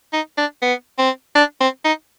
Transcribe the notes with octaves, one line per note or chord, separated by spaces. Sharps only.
D#4
D4
B3
C4
D4
C4
D#4